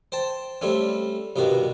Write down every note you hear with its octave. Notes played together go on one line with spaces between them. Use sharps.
C5 G5 A5
G3 A3 C4 C#4
C2 G2 B2 D#3 F#4